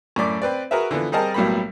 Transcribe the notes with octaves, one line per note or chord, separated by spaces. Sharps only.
F#2 A2 D5 D6
C4 B4 D5
F#4 G#4 A#4 B4 E5
D3 E3 F3 B3
G3 C4 G#4 A#4 D#5 A5
B1 A2 F#3 G3 A#3 B5